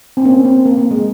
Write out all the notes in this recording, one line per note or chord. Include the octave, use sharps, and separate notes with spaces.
C4
A#3 C#4
C4
A#3
A#3
G#3